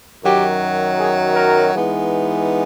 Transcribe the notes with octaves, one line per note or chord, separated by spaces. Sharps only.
F#2 D#3 F#3 G4
G#4
A#4
E3 G#3 B3 D#4